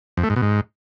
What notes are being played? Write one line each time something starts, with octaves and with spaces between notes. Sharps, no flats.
F2
A3
G#2
B2
G#2